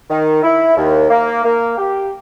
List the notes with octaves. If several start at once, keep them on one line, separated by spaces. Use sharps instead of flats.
D#3
E4
D#2
A#3
A#3
G4